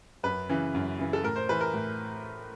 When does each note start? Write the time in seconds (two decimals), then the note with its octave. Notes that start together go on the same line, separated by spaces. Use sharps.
0.23 F#2 B4
0.49 C#3 E3
0.74 F#2
0.99 C#3 E3
1.13 A4
1.24 A2 A#4
1.36 C5
1.49 E3 B4
1.61 A#4
1.74 A2